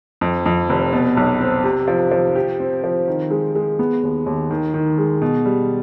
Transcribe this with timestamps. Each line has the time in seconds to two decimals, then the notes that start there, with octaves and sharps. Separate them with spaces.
0.21 F2
0.46 F2
0.70 F1
0.93 B2
1.17 B1
1.40 C4
1.64 C3
1.88 F3
2.11 F3
2.35 G4
2.60 C4
2.84 F3
3.08 D#3
3.31 G#3
3.55 G#3
3.79 B3
4.03 D#2
4.26 D#2
4.51 D#3
4.74 D#3
4.98 G#3
5.22 B2
5.45 G3